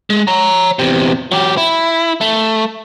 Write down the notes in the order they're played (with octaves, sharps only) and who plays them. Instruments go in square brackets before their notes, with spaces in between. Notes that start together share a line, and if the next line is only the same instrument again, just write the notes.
[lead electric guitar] G#3
C#5 A#5
E2 C3
F#3 G4
E4
A3